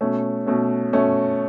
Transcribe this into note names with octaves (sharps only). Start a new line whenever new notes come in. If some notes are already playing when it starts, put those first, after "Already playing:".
B2 A3 C#4
B2 A3 C#4
B2 A3 C#4